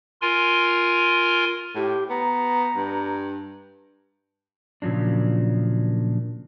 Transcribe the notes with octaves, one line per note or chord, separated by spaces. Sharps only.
F4 A#4 G#5 C6
A2 G4
B3 A#5
G2
A#2 C#3 F3 F#3 D4